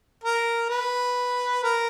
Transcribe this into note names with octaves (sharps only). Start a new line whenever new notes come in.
A#4
B4
A#4